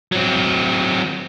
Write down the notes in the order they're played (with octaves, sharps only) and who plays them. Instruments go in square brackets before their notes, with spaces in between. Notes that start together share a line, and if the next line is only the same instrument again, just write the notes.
[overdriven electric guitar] F#3 C4